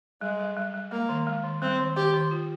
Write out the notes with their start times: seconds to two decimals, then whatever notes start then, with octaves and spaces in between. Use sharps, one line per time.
0.21 G3 G#3
0.40 G3
0.57 G3
0.74 G3
0.91 G#3 A#3
1.09 D#3
1.27 G#3
1.44 D#3
1.62 G3 C4
1.79 D#3
1.96 D#3 G4
2.13 D#3
2.31 F4